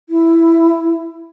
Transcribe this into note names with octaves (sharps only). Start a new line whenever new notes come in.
E4